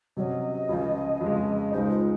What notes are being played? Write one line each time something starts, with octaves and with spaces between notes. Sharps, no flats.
C3 F#3 C#4 D#5
C#2 C#3 F3
F2 C#3 F3 G#3
C#2 C#3 G#3 D#4 C5
F4